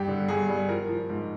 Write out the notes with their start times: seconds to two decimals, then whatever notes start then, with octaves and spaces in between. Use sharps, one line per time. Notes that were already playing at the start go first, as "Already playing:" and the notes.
Already playing: G2 G4
0.08 D3
0.28 G2 G#4
0.49 G3
0.69 F3 A#4
0.89 F3
1.09 G#2